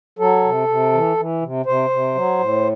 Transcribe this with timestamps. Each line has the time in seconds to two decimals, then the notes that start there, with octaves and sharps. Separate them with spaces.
0.19 F#3 A4
0.44 C3
0.68 C3
0.93 E3
1.17 E3
1.41 C3
1.66 C3 C5
1.90 C3
2.15 F#3
2.39 A2